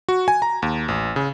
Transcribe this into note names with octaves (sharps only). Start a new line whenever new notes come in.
F#4
G#5
A#5
D#2
A1
C#3